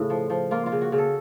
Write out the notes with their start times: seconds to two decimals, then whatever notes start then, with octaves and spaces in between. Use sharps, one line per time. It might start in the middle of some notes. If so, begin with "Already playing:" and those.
Already playing: A2 C#3 C#4
0.10 F3
0.30 F3
0.51 A#3 F4
0.66 F4
0.72 C#3
0.82 F#4
0.92 C#3
0.98 A4